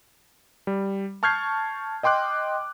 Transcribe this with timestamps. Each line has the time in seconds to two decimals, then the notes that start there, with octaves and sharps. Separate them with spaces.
0.67 G3
1.23 A5 C#6 F6 G6 G#6 C7
2.03 D#5 G5 C6 D6 F#6